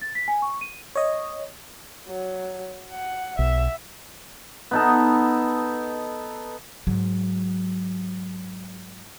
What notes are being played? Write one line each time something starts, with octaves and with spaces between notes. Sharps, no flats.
A6
B6
G#5
C#6
D#7
C#5 D#5
F#3
F#5
B1 E5
B3 D#4 A4
G#2 F#3